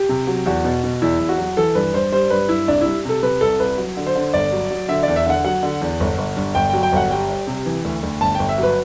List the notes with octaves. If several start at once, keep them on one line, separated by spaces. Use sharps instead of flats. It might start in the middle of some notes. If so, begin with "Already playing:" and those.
Already playing: G4
C3
F#3
E2 F#4
B2
B2
E2 E4
E2
F#4
F#3
E3 A4
G2 B4
G2 C5
G3 C5
G2 B4
G2 E4
C2 D4
G3 E4
C3 A4
C3 B4
C2 A4
C2 B4
F#3
D3
C5
D3
G1 D5
F#3
F#3
D3 E5
E2 D5
E5
D3 F#5
F#3 F#5
D3
E2
G1
G1
G2
G1 G5
F#3 G5
G5
G1 F#5
G3 G5
G3
C3
E3
D2
D2
G1 A5
G1 G5
E5
F#3
B4